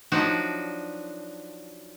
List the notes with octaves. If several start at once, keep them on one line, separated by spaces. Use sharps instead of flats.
F3 F#3 D4 D#4 F#4